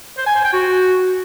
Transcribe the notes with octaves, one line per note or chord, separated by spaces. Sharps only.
C5
G#5
C5
G5
F#4